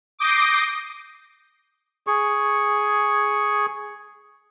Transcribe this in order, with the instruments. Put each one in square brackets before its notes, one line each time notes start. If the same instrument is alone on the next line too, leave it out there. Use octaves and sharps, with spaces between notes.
[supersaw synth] D6 D#6 G6 A#6 C7 D7
[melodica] G#4 C#6